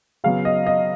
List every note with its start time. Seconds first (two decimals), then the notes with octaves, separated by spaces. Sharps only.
0.24 C#3 F#3 B3 F5
0.45 D#5
0.67 D#5